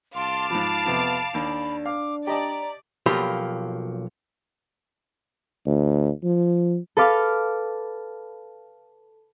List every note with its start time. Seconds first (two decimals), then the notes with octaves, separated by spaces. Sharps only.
0.15 C2 F5 A5 C6 D6
0.51 G#2 F3 B5
0.86 F2 C3 B3
1.34 D#2 D4 B5
1.86 F5 D6
2.27 G4 D5 D#5 A5 A#5
3.06 B1 F3 F#3 A#3 G4 B5
5.66 D2
6.23 F3
6.97 A4 B4 F5 D6 F6